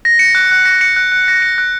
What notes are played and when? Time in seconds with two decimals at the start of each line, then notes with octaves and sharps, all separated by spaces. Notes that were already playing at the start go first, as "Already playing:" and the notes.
0.05 A#6
0.19 C#7
0.35 F#6
0.51 F#6
0.65 A#6
0.81 C#7
0.96 F#6
1.12 F#6
1.28 A#6
1.42 C#7
1.58 F#6